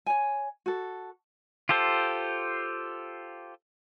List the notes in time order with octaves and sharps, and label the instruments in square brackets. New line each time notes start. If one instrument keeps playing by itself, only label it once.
[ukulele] C#5 G#5
F#4 A4
[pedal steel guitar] F4 G4 A4 C5